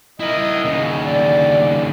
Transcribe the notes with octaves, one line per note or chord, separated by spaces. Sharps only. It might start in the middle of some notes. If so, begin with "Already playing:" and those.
E4 A#4 D#5
D#2 C#3
D5